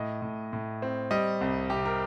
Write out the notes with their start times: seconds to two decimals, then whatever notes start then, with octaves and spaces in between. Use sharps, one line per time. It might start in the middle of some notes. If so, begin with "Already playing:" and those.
Already playing: A2 D#5
0.22 A2
0.53 A2
0.82 C4
1.11 G3 D#5
1.41 C2
1.70 C3 G4
1.85 A#4